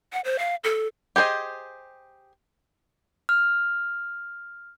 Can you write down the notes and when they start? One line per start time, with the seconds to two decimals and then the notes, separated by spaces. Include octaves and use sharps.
0.13 F#5
0.25 C5
0.39 F5
0.64 A4
1.16 G4 G#4 C5 D#5
3.29 F6